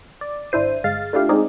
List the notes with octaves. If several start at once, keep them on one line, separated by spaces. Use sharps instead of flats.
D5
G#1 D4 E4 C5 D#7
G1 G#3 F5 A6
A3 D4 E4 F4 G4 F5
G#3 C4 D#4 G#4 D5